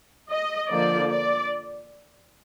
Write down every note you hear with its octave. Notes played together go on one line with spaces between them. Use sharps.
D#5
D3 F3 A#3 D5
D5